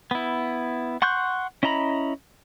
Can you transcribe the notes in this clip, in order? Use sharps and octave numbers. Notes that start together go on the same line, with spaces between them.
B3 E4
F#5 C6 C#6 F#6 G6
C#4 E4 D#5 A#5 B5